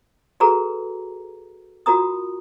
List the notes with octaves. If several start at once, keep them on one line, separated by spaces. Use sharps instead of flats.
F#4 G#4 A4 B4 A#5
F4 F#4 A#4 A#5 D#6